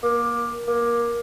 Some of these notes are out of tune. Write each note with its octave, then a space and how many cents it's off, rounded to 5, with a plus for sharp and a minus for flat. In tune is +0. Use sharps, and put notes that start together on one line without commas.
A#3 +25
A#3 +20